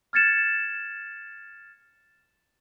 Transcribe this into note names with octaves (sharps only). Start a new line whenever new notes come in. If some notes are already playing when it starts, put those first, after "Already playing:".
F6 G#6 A6 C#7 E7